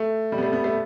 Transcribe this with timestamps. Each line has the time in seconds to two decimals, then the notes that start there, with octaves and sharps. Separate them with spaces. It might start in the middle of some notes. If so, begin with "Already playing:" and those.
Already playing: A3
0.32 G3
0.38 B3
0.43 A3
0.53 B3
0.64 A3